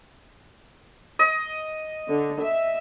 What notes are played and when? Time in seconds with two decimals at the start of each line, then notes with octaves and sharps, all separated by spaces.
1.19 D#5
2.09 D3
2.42 E5